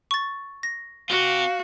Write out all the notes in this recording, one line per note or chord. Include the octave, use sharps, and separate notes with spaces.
C#6 A6
A#6
C4 F#4 G4 F5